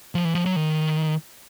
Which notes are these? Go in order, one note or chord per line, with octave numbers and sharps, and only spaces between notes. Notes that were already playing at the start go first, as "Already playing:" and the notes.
F3
E3
F3
F#3
D#3